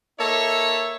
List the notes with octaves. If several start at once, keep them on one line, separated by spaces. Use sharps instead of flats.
A#3 D#4 A4 C#5 E5